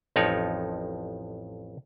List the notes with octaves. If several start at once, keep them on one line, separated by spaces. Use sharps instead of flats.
A1 F2 F3 D#4 C#5 D5